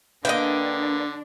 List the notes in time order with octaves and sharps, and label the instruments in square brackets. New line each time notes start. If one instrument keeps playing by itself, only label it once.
[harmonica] D3 [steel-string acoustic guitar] A#3 B4 [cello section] D4 [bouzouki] D#5 E5 G5